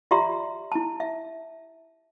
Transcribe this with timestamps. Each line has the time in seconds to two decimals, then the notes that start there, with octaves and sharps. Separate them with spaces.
0.11 F4 G4 D5 E5 A#5 C6
0.72 E4 A5
1.00 E5